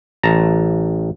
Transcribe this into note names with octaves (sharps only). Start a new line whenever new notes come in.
A1 A5 A#5